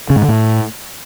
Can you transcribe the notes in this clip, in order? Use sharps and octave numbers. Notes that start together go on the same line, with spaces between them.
C#3
G#2
D3
A2